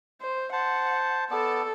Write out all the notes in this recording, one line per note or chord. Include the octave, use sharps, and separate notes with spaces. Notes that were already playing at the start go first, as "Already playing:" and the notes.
C5
C5 F#5 A5
B3 A4 D5 A5